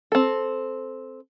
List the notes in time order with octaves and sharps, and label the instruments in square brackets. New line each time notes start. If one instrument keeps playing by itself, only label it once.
[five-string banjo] C4 A4